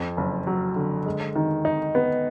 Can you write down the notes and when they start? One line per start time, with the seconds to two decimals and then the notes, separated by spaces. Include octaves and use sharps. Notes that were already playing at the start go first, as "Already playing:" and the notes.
Already playing: F2
0.17 F#1
0.47 F#3
0.76 D3
1.06 G#3
1.35 D#3
1.65 D#4
1.95 B3